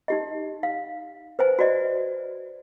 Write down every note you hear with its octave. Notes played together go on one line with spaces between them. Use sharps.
D#4 G4 D#5
F5
B4 C5 G#5
F#4 C5 D5 D#5